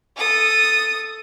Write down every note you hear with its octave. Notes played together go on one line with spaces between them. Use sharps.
A4 D#6